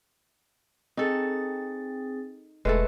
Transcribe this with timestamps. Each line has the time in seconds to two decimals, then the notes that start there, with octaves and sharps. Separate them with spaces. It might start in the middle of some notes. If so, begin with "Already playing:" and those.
0.97 C4 D#4 G#4 A4 A6
2.65 E1 G#3 A3 A4 B4